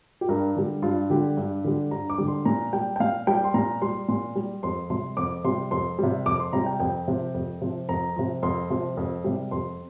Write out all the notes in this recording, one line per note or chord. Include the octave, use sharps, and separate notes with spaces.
G4
G2 A#4
D3 G3
G2 F4
D3 G3 G4
G2
D3 G3
G2 A#5
D6
D3 G3
C6
A#2 A#5
G3 G5
G5
A#2 F5
G3 G5
C6
A#2 A#5
G3 C6
A#2 C6
G3
F2 C6
C3 G3 C6
F2 D6
C3 G3 C6
F2 C6
C3 G3
F2 D6
C6
C3 G3 A#5
G5
F2 G5
C3 F3
F2
C3 F3
F2 A#5
C3 F3
F2 C6
C3 F3 C6
F2
C3 G3
F2 C6